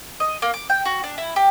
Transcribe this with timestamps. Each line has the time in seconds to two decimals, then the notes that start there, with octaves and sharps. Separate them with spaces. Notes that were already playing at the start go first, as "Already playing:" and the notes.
0.20 D#5
0.42 A#3
0.54 D6
0.70 G5
0.85 F#4
1.04 D4
1.18 E4
1.36 G4